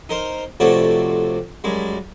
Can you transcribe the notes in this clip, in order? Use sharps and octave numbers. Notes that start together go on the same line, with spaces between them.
D#4 A#4 C5
F2 C3 A3 F#4 C#5 D5
F#2 G3 G#3